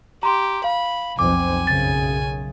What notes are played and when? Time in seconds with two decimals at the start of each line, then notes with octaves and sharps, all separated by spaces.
0.23 G4 A#5 C6
0.64 F5 B5
1.19 B1 F2 C4 G#5 D6
1.67 B1 F#2 C#3 A6